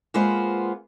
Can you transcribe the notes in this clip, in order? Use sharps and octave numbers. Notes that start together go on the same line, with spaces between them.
G#3 A#3 B3 F4 B4 C5